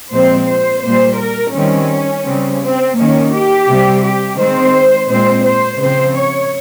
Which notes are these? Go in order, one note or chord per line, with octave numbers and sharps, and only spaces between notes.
A#2 F3 G#3 C4 C5
C5
A#2 G3 A#3 C5
A#4
D#3 G3 C4 C#4
C#3 G3 C4
C4
D#3 A#3 C#4
G4
C3 G3 C4
G4
D#3 G#3 C4 C5
A#2 G#3 C4 C5
C5
C#3 F3 C4 C5
C#5